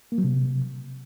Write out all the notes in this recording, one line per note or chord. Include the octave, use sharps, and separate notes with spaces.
A#3
F#3
C3